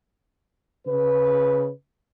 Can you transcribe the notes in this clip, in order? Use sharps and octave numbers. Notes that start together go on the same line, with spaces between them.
C#3 B4